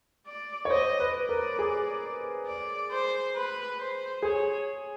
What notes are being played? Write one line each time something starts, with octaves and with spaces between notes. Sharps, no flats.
D5
C#5
C5 D#5
B4
D5
A#4
G#4
D5
C5
B4
C5
G#4 C#5